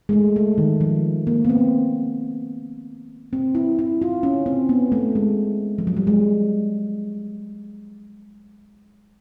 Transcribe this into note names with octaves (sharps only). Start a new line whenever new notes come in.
G#3
A3
A3
D#3
F3
A#3
B3
C4
C4
E4
E4
F4
C#4
C4
B3
A3
G#3
F3
F#3
G3
G#3